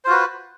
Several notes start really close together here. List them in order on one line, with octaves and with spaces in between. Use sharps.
C5 F4 F#4 B4